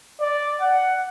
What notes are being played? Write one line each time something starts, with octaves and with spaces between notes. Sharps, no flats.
D5
F#5